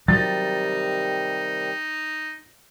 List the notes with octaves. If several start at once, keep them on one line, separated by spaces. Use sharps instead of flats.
C3 D#3 F#3 G3 D#4 A6